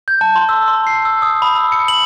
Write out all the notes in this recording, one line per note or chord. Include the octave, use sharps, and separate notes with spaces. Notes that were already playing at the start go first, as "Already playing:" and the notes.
G6
A5
C6
E6
C6
C7
E6
D#6
B5
E6
C#7
F#7